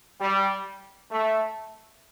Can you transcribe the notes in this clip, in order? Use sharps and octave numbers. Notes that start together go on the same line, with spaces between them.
G3
A3